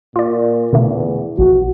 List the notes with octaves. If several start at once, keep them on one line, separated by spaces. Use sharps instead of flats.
A#2 F4 D5
E2 B2 D3 A3
A#1 A#2 F#4